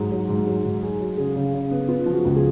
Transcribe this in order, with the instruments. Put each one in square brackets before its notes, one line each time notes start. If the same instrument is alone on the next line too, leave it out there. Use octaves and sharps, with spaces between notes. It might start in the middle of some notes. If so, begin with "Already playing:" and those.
Already playing: [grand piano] G#2 F#3 [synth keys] G#4
[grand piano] F#3
G#2
F#3
G#2
G#4
F#3
[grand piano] C#3 [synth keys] G#4
[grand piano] C#3
C#3
B3
[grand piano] B3 [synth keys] F4
[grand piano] F3
[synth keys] F#4
[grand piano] C#2
[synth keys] G#4